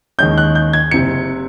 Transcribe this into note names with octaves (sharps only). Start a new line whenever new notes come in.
D#2 D#3 G#3 C#4 G6
F#6
G6
G#6
F#1 C3 C#7